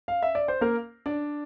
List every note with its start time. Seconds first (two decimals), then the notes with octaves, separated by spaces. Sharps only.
0.08 F5
0.22 E5
0.35 D5
0.48 C5
0.61 A#3 A#4
1.06 D4 D5